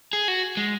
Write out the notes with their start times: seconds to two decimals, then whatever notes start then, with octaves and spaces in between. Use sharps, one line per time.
0.13 G#4
0.28 F#4
0.57 G#3